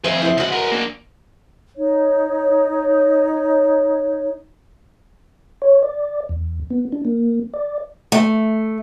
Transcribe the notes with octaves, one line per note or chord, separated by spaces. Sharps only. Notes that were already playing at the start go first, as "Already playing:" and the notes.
F2 G#4 C5 E5
E4 C5
C#2 G#3 F#4 F#5
A#4 B4
A#3 D4
D#4 C#5
C#5
D5
E2
B3
D4
A#3
D5
A3